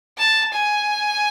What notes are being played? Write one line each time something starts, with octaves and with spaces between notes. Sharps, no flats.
A5
G#5